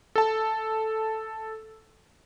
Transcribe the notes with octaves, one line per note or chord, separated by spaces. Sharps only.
A4 A5